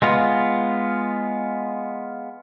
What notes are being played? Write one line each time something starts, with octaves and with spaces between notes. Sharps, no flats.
G#3 B3 F4